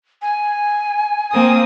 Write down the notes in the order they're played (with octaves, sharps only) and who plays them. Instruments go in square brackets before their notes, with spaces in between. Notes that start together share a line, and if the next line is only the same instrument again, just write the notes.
[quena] G#5
[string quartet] A#3 C4 D#6